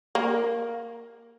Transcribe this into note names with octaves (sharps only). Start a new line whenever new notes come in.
A#3